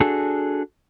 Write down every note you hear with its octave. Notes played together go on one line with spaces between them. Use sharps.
D4 F#4 G#4 A4